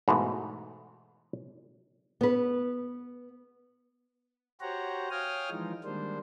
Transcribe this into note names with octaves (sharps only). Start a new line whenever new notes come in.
G#2 B2 E3 A3
B3 B4
F#4 G4 C5 C#5 F#5 A#5
C#5 F5 G5 G#5 D#6 F6
E3 F3 G#3 D#4 F4
D#3 G3 G#3 A#3 D4 C5